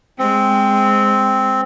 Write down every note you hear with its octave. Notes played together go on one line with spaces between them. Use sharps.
G#3 C4